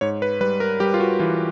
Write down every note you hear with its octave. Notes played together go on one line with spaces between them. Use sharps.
G#2 C#5
B4
G3 B4
A#4
G3 G4
F4
F#4
E3 F4